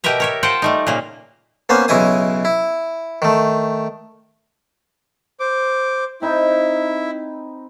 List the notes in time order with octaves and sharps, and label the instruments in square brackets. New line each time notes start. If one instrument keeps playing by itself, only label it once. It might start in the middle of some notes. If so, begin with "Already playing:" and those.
[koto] B2 G4 A#4 B4 E5 A#5
A#4 C#5 E5
F4 C5 F#5 G5 A5
G3 A3 D#4
A#2 C#3 A#3
[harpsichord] A#3 B3 C#4 C5 G#5
B1 C#3 E4 D#5 G#5 D#6
E4
D#3 A3
[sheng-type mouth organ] C5 D6
[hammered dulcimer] C4 D#4 B4 [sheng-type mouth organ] E4